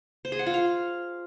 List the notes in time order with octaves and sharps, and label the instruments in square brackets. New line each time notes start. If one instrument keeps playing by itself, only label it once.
[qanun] C5
G#4
F#5
F4
F5